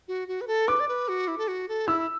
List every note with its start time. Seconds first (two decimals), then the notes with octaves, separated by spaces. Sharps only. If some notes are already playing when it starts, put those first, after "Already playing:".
0.08 F#4
0.28 F#4
0.41 B4
0.47 A4
0.68 B4 D6
0.80 D5
0.88 B4
1.08 F#4
1.28 E4
1.38 A4
1.48 F#4
1.68 A4
1.88 E4 E6